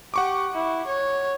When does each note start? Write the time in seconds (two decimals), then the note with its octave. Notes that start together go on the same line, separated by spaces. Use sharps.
0.14 G4 F#5 C#6 D6
0.54 E4
0.87 C#5